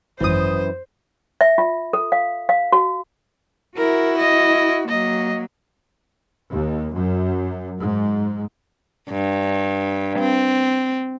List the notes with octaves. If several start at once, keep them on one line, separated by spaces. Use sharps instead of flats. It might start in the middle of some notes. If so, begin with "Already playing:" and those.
G#1 F#2 E3 C5 D#6
E5
F4
A4
F5
F5
F#4
E4 F#4 A#4
D#5
F#3 A#3 D#5
D#2
F#2
G#2
G2
C4